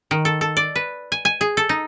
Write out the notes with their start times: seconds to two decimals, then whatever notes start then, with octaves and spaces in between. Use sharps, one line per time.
0.11 D#3
0.25 A4
0.41 A4
0.57 D5
0.75 B4
1.12 G#5
1.25 G#5
1.41 G#4
1.57 A4
1.69 D#4